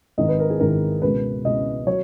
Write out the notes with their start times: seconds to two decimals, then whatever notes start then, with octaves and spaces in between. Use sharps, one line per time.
0.18 G#1 G#2 D#3 D#5
0.28 B4
0.39 A#4
0.50 G#4
0.60 G#1 G#2 D#3 A#4
1.02 C#2 B2 G#3 B4
1.44 C#2 B2 G#3 D#5
1.87 F#3 C#5